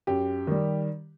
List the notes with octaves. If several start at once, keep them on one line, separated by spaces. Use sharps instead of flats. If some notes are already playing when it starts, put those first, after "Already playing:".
F#2 G4
D#3 G3